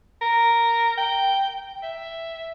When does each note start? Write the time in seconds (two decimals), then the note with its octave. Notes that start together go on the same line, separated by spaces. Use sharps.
0.21 A#4
0.97 G5
1.83 E5